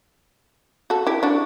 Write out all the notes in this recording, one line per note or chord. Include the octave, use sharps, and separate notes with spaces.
F#4 A4
E4 G4
D4 F#4